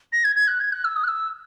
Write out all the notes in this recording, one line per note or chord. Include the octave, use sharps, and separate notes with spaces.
A#6
G#6
G#6
F#6
G#6
F#6
E6
D#6
F#6
E6